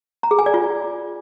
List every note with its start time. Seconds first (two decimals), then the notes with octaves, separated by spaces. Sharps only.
0.23 A#5
0.31 G#4
0.39 G#5
0.46 D5
0.54 F4